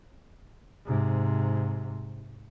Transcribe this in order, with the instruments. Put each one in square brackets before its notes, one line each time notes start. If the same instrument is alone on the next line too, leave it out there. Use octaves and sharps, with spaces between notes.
[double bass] G#2 C3